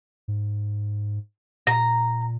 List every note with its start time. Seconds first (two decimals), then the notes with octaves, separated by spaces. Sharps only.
0.28 G#2
1.67 A#2 A#5